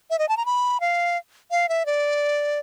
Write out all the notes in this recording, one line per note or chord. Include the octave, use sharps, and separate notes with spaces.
E5
D#5
A5
A#5
B5
F5
F5
E5
D5